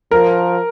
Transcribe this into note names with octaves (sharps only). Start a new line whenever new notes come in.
F3 A#4